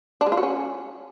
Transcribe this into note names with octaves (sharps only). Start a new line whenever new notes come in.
D4
G#3
F4
F#4
C#4